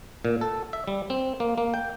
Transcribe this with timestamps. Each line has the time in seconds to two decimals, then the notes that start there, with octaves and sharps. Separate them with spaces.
0.25 A#2
0.41 A4
0.73 E5
0.88 G3
1.10 C4
1.40 A#3
1.58 A#3
1.74 G5